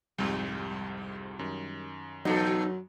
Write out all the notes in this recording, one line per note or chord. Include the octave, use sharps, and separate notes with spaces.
C2 F2 G#2 G3
F#2 D#3
E2 B2 F#3 D#4 A4